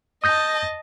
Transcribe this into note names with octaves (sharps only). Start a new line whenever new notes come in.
D#5 A5 D#6 G6 A#6